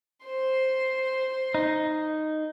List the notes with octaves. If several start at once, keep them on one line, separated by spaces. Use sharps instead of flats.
C5 C6
D#4